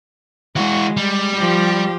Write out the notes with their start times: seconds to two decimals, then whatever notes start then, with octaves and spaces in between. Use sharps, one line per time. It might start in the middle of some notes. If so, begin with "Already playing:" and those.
0.56 E3 G#3 F#4
0.97 G3
1.36 F3 G4